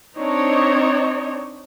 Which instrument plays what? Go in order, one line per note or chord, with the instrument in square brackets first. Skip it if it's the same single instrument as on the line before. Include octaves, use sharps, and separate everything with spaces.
[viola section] C4 D4 D#4 C#5